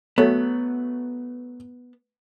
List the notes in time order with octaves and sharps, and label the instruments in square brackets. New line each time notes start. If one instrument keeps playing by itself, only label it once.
[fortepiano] F#3 A3 [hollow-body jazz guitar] B3